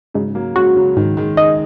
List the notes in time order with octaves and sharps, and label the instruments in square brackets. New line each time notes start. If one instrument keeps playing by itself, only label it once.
[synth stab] G#2 [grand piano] C#3 F#3
[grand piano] F#3 A#3
[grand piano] G#3 C#4 [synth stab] F#4
[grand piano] C#3 F#3
[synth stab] G#2 [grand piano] D#3
[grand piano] D#3 G#3
[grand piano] D#4 G#4 [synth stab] D#5